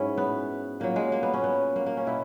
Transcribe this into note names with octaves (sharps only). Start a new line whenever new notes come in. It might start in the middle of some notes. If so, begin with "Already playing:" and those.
Already playing: G#2 F#3 C#4 E4
B3
A#2 F#3 A#3
G#3
A#3
B3
C#4
B3
A#3
A#3
C#4
B2 E4